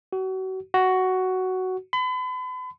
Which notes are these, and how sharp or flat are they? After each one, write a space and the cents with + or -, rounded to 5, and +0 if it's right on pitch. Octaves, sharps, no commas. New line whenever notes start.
F#4 +35
F#4 +10
B5 +40